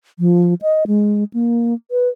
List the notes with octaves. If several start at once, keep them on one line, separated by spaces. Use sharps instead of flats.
F3
D#5
G#3
A#3
B4